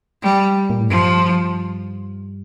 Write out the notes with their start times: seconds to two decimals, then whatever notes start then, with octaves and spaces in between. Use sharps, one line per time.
0.22 G3
0.70 A#2
0.80 A2
0.89 G2 F3